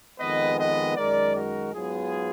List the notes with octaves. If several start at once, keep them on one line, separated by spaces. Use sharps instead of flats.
F2 D#3 G#3 B3 B4 D#5
B4 D#5
F#2 D#3 G#3 A#4 D5
F#4 A#4
G#2 F#3 B3 F4 G#4